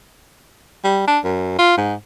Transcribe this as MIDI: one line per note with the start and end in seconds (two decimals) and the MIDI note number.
0.84 1.03 55
1.08 1.19 62
1.24 1.56 42
1.59 1.77 65
1.77 1.94 44